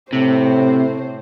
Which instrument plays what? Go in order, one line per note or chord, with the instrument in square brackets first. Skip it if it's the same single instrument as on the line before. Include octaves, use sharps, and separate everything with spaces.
[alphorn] A2 [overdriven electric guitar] C3 [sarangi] C5